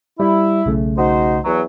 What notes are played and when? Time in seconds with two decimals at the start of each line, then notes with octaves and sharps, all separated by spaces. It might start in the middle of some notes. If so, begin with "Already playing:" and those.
0.20 G3 E4
0.66 B1 C#3 A3
0.98 D#4 F#4 C5
1.44 E2 F#3